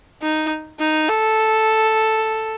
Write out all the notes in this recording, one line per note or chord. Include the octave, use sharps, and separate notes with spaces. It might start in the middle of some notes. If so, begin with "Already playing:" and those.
D#4
D#4
A4